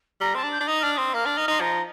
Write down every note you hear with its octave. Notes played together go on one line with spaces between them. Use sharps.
G3 A#5
C4 A5
D4
G6
D4
D#4 D#6
D4 F6
C4 D#6
A#3 F6
D4
D#4
D#4 C6
F3 A#5